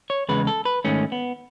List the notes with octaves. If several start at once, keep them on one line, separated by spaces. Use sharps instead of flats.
C#5
E2 C#3 G#3 B4
A4
B4
G#2 D#3 A3 C#4
B3